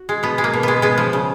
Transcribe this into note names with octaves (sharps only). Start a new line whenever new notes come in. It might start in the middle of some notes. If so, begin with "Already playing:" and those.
Already playing: F#4
G#3
B2 B3
G#3
A#3
B2
G#3 B3
G#3 B3
F3
C#3